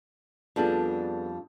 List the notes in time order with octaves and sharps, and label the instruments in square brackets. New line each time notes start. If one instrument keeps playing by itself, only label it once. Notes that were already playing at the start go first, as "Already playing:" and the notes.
[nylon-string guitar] F2 G3 D4 [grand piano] B3 G#4 A4